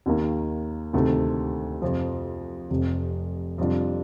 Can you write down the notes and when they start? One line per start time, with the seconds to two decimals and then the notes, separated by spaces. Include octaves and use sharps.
0.06 D#2 D#3 A#3
0.93 D2 C3 D#3 A3
1.82 F2 C3 F3
2.70 F1 F2 C3
3.58 F2 C3 G3 D4 F4